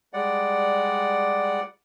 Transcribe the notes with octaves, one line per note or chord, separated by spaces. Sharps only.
G3 G#3 D5 F#5